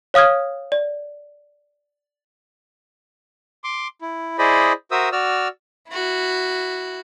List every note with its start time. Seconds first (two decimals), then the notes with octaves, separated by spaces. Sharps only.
0.14 C#5 F5 D#6 F6 G#6
0.72 D5
3.64 C6 D6
4.01 E4
4.38 E4 G#4 C5 D5 D#5 B5
4.91 F#4 A#4 C5 E5 D#6 E6
5.12 F#4 D5 E6 F6
5.90 E4 F#4